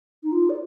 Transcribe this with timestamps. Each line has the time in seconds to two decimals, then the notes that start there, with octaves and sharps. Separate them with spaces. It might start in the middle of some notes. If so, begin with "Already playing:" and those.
0.23 D#4
0.32 F4
0.49 D5